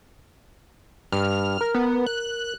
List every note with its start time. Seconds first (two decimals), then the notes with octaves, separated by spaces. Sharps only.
1.12 G2 F6
1.61 A#4
1.74 B3
2.07 F#6